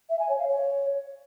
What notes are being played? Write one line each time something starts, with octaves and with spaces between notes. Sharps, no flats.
E5
G#5
C#5
F5
C#5